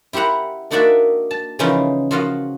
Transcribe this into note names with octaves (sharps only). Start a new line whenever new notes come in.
E4 G4 C5 F#5 A#5
A#3 D4 D#4 F#4 D5 E5
A5
C#3 E3 F3 C#4 D#4
F3 F4 F#4 D#5 F5